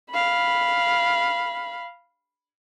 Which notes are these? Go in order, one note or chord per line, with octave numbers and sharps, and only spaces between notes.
F5 B5